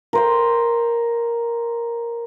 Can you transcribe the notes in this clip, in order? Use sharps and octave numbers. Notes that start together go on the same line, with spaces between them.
A#4 C5 G5